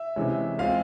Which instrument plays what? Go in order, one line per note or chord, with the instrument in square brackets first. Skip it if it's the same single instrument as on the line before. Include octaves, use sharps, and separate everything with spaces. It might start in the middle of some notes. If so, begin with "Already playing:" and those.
Already playing: [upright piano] E5
[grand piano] C3 E3 G#3 C#4
[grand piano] G#3 C4 F4 [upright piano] F5